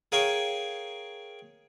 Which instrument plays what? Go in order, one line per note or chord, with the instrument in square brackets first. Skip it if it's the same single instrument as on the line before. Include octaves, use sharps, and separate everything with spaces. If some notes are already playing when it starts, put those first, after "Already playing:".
[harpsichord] G#4 A#4 C#5 F5 G5 C#6